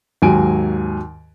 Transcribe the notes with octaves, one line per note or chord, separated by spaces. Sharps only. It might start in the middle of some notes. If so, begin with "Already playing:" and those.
D#2 G#2 F#3 G#5 D7